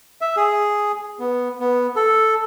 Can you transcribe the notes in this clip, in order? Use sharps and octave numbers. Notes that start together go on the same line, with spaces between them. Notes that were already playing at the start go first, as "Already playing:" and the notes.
E5
G#4
B3
B3
A4